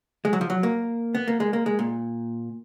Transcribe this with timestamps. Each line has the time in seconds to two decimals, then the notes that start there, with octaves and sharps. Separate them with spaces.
0.25 G#3
0.33 F#3
0.41 F3
0.50 F#3
0.63 A#3
1.15 B3
1.28 A#3
1.40 G#3
1.53 A#3
1.66 G#3
1.79 A#2